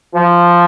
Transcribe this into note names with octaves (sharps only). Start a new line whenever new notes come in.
F3